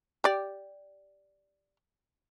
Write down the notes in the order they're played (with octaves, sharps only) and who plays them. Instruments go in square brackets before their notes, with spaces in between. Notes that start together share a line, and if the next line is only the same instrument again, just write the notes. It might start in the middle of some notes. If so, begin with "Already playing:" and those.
[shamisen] G4 D5